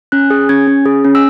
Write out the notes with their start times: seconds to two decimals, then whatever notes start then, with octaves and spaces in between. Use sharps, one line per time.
0.12 C#4 F#6
0.30 G#4
0.49 C#4 G#6
0.68 C#4
0.86 G#4
1.04 C#4
1.15 E6